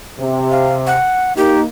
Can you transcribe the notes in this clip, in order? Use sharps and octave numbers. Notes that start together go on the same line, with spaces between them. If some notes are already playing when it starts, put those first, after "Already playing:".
C3
F5
F#5
A#3 D#4 G4